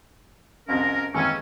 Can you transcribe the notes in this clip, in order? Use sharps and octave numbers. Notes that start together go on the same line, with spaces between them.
C2 F2 G#2 C3 C#4 A#4
D#2 G#2 E3 G#3 C4 C#4